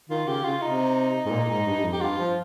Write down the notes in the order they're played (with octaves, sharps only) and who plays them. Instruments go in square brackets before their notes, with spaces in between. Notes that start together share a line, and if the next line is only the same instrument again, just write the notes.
[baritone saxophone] D#3 [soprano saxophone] F4
[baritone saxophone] C#3 [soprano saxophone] G4
[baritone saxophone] C#3 [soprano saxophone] F4
[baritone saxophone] C3 [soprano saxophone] D#4
[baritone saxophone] G#2
A#2
G#2
G2
G2
F2
[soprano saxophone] G4
[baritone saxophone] G2 [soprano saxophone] F4
[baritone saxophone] F3